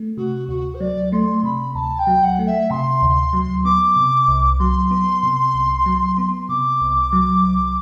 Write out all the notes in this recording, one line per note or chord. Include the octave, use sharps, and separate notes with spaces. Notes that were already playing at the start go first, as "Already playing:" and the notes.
Already playing: A3
C3 F#4
D2 F#4
C5
F#3 D5
A3 C6
C3 B5
D2 A5
G5
F#3
F#5
A3
E5
C3 C6
D2
F#3
B3 D6
C3
C2
F#3 C6
B3
C3
C2
F#3
B3
C3 D6
C2
F#3
C2